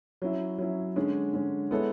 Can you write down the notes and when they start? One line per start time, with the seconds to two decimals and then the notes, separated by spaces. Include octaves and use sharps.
0.22 F#3 C#4 E4
0.58 F#3 C#4 E4
0.96 D3 G#3 C#4
1.33 D3 G#3 C#4
1.71 G#3 B3 E4 A4 C#5